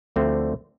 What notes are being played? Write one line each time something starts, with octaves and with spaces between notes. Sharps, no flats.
D2 D3 F3 A3 C4